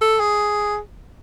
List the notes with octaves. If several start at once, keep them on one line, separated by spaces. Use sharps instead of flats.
A4
G#4